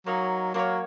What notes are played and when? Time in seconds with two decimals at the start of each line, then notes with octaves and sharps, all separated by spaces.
0.06 F#3 A#3 D#4 F#4 C#5
0.54 F#3 A#3 D#4 F#4 C#5